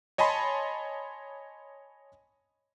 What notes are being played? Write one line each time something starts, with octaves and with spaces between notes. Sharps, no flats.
C#5 D#5 G#5 A5 B5 C6